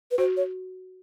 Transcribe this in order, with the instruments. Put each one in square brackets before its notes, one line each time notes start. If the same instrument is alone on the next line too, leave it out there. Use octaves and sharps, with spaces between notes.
[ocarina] B4
[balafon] F#4 [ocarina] C5
[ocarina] C#5